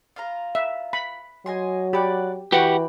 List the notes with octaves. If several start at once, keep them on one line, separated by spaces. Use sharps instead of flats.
F4 F5 A#5
E5
B5
F#3 D#5 G#5 C6
F#4 G4 D5 B5
E3 F#4 G4 B4 F#5 G5 B5 D6